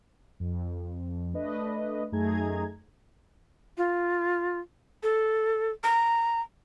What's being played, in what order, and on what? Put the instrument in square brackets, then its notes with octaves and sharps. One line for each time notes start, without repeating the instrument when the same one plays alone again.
[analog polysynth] F2
A3 D4 B4 D#5
F#2 A3 D#4 G#4 A#5 G#6
[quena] F4
A4
A#5